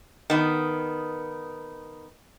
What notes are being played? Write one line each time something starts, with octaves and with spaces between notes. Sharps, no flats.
D#3 B3